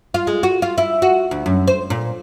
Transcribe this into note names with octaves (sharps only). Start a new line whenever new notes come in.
F4
G#3
F#4
F4
E4
F#4
D2
F#2
C5
A#2